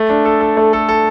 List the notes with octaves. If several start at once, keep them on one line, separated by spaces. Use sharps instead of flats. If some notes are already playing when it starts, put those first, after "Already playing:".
Already playing: A3
D4
A4
A4
A3
A4
A4